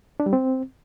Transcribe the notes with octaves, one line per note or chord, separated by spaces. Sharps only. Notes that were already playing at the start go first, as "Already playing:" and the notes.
D4
G3
C4